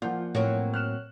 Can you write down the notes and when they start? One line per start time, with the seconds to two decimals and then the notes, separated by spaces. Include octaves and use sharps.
0.02 F3 A#3 F4 D5 F#5 G6
0.35 A2 F#3 A#3 C4
0.74 F6 F#6 E7